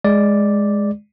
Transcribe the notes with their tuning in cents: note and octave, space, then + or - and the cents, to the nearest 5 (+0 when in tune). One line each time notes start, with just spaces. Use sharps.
G#3 +0 D5 +0